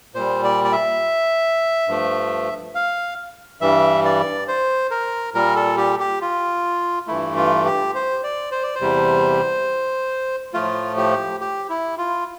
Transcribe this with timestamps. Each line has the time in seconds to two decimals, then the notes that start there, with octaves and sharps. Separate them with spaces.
0.15 A#2 G3 C5
0.44 D5
0.64 D5
0.72 E5
1.88 G2 F3 A3
2.75 F5
3.61 G2 E3 G3 E5
4.05 D5
4.48 C5
4.91 A#4
5.34 A#2 G3 A#4
5.56 A4
5.77 G4
6.00 G4
6.21 F4
7.07 G2 E3 A3 E4
7.36 F4
7.65 G4
7.95 C5
8.24 D5
8.52 C5
8.63 D5
8.75 C5
8.81 E2 C3 G3
10.54 A2 F3 A3 F4
10.97 G4
11.41 G4
11.69 E4
11.98 F4